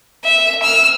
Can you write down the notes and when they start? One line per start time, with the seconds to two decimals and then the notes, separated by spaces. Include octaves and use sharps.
0.24 E5
0.63 E6 F6